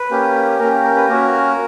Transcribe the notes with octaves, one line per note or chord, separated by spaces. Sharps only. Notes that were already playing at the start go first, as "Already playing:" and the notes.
Already playing: B4
A#3 C#4 G4
A#3 C#4 G4 A#4
A#4
B4
A#3 C#4 F#4 A#4